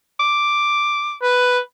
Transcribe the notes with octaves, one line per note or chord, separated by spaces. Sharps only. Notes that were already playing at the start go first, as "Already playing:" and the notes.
D6
B4